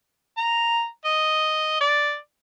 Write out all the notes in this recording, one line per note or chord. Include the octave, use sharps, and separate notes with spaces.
A#5
D#5
D5